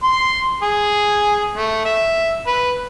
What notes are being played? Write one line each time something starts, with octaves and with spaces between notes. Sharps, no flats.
C6
G#4
A3
E5
B4